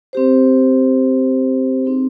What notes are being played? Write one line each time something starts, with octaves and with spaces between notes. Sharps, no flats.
C4 G4 C5
C4 D#4 G#4